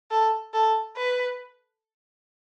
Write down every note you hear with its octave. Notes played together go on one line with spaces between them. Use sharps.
A4
A4
B4